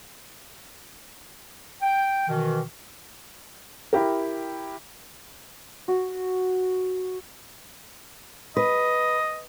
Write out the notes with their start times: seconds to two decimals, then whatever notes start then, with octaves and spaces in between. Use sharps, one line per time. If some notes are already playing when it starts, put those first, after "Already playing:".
1.82 G5
2.28 B2 D#3 E3
3.93 E4 G4 A#4
5.88 F#4
8.57 B4 D#5